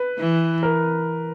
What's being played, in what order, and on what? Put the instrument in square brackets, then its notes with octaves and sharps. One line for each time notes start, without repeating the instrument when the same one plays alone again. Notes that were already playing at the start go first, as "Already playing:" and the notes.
Already playing: [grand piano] B4
[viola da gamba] E3
[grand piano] A#4